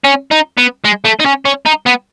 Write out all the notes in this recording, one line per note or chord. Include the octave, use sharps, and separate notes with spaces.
C#4
D#4
B3
G#3
A3
D#4
C#4
C#4
D#4
B3